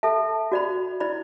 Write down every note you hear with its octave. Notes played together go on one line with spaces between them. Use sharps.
A4 E5 A5
F#4 D5 B5
E4 D5 B5